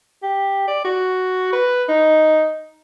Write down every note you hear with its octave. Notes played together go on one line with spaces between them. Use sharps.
G4
D5
F#4
B4
D#4